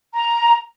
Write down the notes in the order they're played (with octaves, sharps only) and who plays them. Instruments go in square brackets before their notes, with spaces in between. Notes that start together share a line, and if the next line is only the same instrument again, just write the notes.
[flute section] A#5